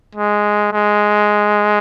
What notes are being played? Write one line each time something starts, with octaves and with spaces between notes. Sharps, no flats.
G#3
G#3